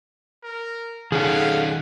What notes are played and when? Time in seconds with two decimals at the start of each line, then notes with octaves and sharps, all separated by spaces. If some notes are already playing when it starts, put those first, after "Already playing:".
0.43 A#4
1.12 D#3 C#4 G#4 A4 F5 F#5